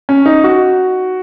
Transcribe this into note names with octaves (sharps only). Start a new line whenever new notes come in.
C#4
D#4
F#4